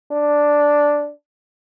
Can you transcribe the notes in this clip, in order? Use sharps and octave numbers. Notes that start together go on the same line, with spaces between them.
D4